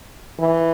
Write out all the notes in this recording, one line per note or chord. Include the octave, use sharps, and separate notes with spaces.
E3